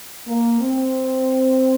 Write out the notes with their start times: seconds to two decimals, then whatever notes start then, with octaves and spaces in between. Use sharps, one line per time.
0.27 A#3
0.61 C4